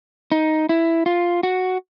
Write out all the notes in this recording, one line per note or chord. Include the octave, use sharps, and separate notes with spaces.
D#4
E4
F4
F#4